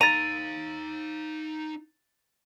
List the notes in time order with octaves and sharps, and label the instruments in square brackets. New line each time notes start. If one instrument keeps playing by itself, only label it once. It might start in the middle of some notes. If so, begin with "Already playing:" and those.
[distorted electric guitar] D#4 F5 [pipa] A#5 [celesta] A6 D#7